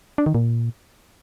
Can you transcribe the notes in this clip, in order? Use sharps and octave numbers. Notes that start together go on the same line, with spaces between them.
D4
D#3
A#2